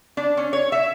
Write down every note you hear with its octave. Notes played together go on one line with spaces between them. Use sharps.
D4
C#4
C#5
E5